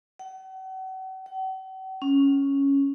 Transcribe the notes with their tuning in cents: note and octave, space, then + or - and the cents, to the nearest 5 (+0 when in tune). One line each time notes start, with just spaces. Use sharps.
F#5 +40
F#5 +45
C#4 +0